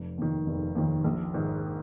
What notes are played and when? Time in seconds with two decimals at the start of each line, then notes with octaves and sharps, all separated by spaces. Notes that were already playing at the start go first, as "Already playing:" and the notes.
Already playing: F1
0.18 D#2 D#3
0.47 F1
0.75 D#2 D#3
1.04 A#1
1.34 G#2 D#3